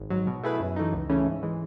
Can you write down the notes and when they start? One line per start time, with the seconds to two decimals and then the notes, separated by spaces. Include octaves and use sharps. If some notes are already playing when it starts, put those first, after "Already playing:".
Already playing: G#1
0.10 G#2 F#3
0.27 B2
0.43 A3 E4 G#4 B4
0.60 F#2
0.76 E3 A3 D#4
0.93 C#2
1.09 C#3 E3 A3 C#4
1.26 G#2
1.43 E3 G#3